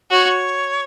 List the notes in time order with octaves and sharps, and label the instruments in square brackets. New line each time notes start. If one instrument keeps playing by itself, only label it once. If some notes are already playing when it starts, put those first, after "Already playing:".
[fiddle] F#4 [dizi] C#5